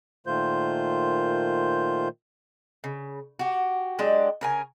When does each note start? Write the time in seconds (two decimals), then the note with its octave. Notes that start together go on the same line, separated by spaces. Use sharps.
0.27 A#2 D#3 A3 F4 C5 G6
2.84 C#3
3.39 F#4 G4
3.99 F#3 G#3 D4 G4
4.41 C#3 A#4 G#5